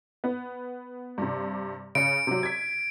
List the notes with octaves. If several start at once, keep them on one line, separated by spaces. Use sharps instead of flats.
B3
G2 C3
C#3 C#7 D7
C3 F#3
G#6 B6